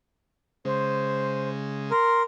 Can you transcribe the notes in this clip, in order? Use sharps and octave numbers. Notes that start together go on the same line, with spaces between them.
C#3 G#3 C5
A#4 C6